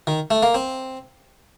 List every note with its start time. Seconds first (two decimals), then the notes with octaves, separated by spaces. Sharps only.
0.07 D#3
0.31 A3
0.43 A#3
0.54 C4